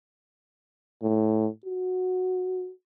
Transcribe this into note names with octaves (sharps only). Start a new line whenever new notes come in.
A2
F#4